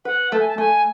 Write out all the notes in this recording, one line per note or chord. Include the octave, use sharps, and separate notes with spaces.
B4 F#5
A3 A5
G#5
A5
A3 G#5